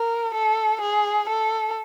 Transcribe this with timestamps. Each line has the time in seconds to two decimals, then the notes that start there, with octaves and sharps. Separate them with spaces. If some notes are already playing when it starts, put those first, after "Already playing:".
Already playing: A#4
0.35 A4
0.81 G#4
1.30 A4